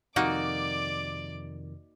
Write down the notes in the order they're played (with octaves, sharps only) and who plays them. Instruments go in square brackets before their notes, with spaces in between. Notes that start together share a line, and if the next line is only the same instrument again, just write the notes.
[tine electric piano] F2 C3 D#3 [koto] A#3 D#4 F#4 [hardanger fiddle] D5 D6